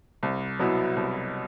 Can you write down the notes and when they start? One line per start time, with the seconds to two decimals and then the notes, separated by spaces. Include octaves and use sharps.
0.23 C2
0.59 B2 F#3 B3 E4
0.97 C2